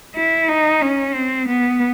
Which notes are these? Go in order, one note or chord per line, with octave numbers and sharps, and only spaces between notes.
E4
D#4
C#4
C4
B3